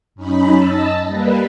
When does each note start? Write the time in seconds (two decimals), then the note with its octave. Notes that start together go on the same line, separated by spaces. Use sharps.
0.15 F#2 C#4 D#4 B5
0.54 D#5 A5 E6
1.06 G3 A#3 B4